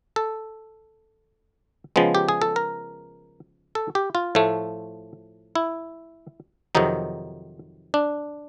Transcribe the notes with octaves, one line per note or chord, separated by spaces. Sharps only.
A4
C#3 F3 G#3 B3
G4
G#4
A4
A#4
A4
G4
F4
A2 F3 A3
E4
F2 C3 D#3 F#3 D#4
D4